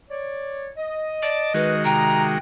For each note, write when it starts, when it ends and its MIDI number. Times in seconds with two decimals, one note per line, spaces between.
0.10 0.67 73
0.10 0.67 74
0.77 1.81 75
1.23 1.53 74
1.23 1.53 81
1.23 1.53 86
1.54 2.38 51
1.54 2.38 56
1.54 2.38 66
1.54 1.73 71
1.85 2.36 48
1.85 2.38 79
1.85 2.24 82